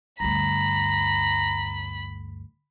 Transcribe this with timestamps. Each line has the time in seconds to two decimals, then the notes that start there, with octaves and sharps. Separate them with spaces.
0.20 D2 G2 A#5 B5